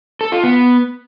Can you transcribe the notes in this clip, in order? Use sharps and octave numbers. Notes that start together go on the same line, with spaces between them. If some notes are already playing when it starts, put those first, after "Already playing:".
A4
F4
B3